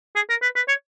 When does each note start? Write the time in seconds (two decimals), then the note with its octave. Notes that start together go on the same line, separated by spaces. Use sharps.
0.15 G#4
0.29 A#4
0.42 B4
0.56 B4
0.68 C#5